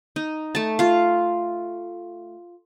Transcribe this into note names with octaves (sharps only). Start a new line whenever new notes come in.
D#4
A3 A5
F4 F5